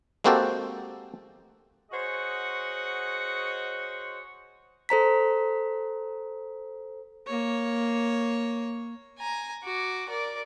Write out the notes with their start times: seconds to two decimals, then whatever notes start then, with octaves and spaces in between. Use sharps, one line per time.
0.24 G#3 A#3 C4 F#4 G4 A4
1.92 F#4 G#4 C5 C#5 D#5 F#5
4.89 A4 C5 A#5 B6
7.27 A#3 C#5
9.18 G#5 A#5
9.64 F#4 D6
10.09 A#4 D5